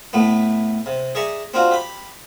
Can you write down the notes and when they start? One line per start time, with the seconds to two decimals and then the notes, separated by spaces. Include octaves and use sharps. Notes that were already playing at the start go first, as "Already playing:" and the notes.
0.13 A2 A3 B3
0.86 C3
1.15 G#4 D5 E5 A#5 C#6
1.54 C4 D4 F4 F#4
1.71 G4 B5